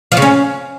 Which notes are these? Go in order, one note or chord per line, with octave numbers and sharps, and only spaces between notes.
F3
C#3
C#4